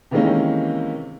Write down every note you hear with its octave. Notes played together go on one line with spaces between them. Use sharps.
C3 D#3 E3 G#3 A#3 C#4